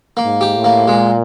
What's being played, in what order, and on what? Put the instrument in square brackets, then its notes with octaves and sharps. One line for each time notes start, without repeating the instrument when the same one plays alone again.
[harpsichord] A#3
[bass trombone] G#2
[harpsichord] G4
[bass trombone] A2
[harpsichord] A#3
[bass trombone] A#2 [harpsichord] G#3